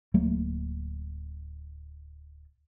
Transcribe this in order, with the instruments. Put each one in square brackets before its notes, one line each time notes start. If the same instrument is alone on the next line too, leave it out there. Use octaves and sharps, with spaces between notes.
[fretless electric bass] D1 F#3 A3 A#3